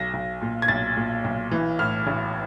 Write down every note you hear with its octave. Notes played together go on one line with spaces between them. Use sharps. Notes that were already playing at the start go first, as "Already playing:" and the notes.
Already playing: B1 A#6
B1
A#2
G#6
B1 A6
A#2
B1
E3
A2 F6
A1